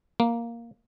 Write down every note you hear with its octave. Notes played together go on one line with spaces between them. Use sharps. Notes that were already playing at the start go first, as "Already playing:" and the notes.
A#3